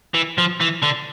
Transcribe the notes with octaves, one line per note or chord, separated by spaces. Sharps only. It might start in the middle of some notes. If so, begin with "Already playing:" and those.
E3
F3
E3
D3